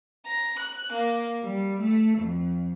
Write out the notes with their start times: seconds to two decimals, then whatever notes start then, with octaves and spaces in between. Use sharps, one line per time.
0.25 A#5
0.58 F#6
0.91 A#3
1.43 G3
1.80 A3
2.19 F2